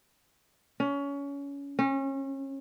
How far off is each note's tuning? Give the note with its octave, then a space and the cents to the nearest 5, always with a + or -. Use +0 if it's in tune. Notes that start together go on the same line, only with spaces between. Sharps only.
C#4 +25
C#4 -30